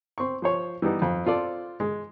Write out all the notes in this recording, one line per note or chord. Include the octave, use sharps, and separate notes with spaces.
C4 C#6
F3 C5 C#5
E3 G3 B3 D#4
F2
C4 F4 A4 D5
G#3